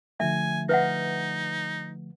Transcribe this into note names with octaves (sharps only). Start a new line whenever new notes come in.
D3 F3 A3 E5 G#5
D#4 B4 E5 F#5